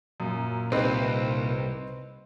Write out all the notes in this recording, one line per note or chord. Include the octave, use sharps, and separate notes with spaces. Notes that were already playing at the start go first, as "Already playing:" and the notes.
F#2 A#2
C2 C4 D#4 B4